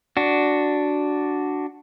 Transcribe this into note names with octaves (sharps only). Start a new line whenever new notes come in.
D4 F#4